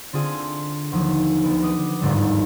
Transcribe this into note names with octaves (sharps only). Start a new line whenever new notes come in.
D3 C4 F4 G#4
D#2 F3 F#3
D2 B3 D7
B4 D6 D#6
G1 D#2 G#2 D3 G3